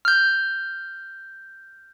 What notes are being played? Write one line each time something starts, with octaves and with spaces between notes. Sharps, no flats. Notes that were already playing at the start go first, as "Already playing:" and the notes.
F6 G6